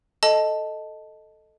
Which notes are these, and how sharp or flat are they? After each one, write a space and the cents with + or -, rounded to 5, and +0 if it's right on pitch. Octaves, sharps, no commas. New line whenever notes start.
A4 +0 D#5 +0 A5 +0